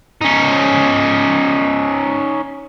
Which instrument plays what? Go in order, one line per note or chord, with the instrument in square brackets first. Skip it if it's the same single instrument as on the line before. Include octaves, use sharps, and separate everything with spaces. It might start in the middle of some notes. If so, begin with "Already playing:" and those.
[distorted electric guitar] C#4 D#4